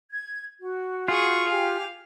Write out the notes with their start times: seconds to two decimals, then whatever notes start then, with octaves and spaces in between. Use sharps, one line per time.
0.10 G#6
0.61 F#4
1.08 F4 G#4 C#6
1.49 G4 F5 G#5